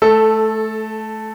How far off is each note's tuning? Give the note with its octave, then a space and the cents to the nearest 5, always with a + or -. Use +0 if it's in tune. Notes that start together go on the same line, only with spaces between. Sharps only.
A3 -20 A4 +0